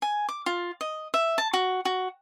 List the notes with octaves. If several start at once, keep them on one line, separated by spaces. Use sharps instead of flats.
G#5
D6
F4
D#5
E5
A5
F#4
F#4